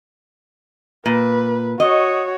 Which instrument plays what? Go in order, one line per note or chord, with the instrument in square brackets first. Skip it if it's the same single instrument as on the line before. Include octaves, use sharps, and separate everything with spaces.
[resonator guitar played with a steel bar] A#2 [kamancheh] B4
[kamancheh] F#4 C#5 [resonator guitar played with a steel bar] D#5